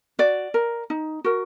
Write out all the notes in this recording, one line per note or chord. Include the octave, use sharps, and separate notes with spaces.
F#4 D5
A#4
D#4
F#4 A#4